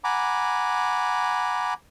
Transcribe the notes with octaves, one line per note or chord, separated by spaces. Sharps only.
F#5 G#5 A#5 B5 D6